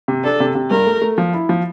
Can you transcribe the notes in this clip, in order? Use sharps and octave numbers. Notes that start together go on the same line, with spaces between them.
C3
D4 A4
C3
C3
G2 A#4
A3
A3
F3
E4
F3